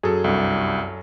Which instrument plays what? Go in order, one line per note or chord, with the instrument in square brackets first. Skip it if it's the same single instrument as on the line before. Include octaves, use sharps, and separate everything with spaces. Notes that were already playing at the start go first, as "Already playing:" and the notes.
[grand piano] F#2 A4 [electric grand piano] G#4
[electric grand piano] C2 G2